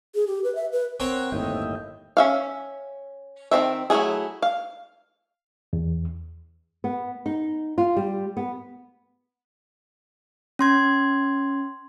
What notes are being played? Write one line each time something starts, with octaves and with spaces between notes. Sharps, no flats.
G#4
G4
B4
E5
B4
C4 A#4 C5 C#5 F#5
G1 D#2 A2 D#5 E5 G5
C#4 E5 F5
D#3 F3 C4 E5
F#3 A3 C#4 E4 G#4
F5
E2
B3
D#4
F4
G3
B3
C#4 C6 G#6